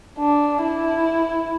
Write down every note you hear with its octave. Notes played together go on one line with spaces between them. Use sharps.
D4
E4